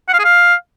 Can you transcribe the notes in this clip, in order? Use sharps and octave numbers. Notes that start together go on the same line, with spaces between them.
F#5
F5
G#4
F5